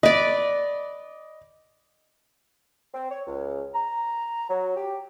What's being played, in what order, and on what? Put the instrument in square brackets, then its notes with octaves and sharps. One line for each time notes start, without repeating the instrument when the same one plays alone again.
[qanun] B4 D5 [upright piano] D#5
[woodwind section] C4
C#5
C#2
A#5
F#3
G4